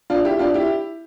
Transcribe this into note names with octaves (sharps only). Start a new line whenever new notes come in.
D4 F4
E4 G4
D4 F4
E4 G4